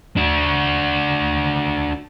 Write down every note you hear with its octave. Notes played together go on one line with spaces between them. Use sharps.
D4 F#4